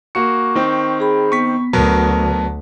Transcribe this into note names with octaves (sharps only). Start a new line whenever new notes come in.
A#3 F#4 C#6 C#7
D#3 C4
G#4 B5
B3 C#6 B6
D2 F#3 B3 A#4 A5